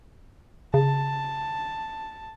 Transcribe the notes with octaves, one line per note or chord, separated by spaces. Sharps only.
C#3 A5